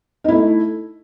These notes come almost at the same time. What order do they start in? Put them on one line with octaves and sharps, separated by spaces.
D#4 E4 A3